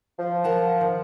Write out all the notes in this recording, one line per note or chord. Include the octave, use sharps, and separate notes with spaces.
F3
A#4 F#5 A5
D#3